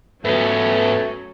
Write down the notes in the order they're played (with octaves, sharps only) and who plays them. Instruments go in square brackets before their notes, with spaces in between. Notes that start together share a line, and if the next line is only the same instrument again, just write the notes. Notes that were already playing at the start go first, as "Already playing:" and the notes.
[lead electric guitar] G#2 B3 [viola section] F#3 C#4 [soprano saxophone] A3 [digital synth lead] B4